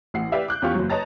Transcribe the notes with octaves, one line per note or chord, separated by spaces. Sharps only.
A1 F#5 C7
G4 B4 D5 E5 F5
D6 F#6 G6
E2 C#4 F4 G4 F5 C#6
F#1 F#3
B4 C#5 D#5 A5 A#5 A6